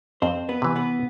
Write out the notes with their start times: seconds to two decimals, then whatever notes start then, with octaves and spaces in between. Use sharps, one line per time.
0.22 F2 C4 C5
0.49 B3 B4
0.62 C3 E3
0.76 B3 B4